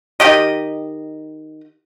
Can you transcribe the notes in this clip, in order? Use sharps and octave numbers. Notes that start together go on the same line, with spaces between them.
D#3 G4 D#5